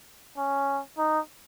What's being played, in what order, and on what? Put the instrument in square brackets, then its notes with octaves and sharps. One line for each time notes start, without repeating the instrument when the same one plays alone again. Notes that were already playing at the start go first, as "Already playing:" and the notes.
[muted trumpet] C#4
D#4